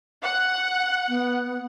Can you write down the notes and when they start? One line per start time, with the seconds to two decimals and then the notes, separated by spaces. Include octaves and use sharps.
0.23 F#5
1.08 B3